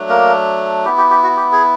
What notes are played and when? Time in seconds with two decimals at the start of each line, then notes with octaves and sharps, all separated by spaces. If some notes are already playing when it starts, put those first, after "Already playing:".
Already playing: F#3 A3 D4
0.09 A#3 A#4
0.85 B3 E4 G4
0.98 G4
1.10 G4
1.23 F#4
1.36 G4
1.52 G#4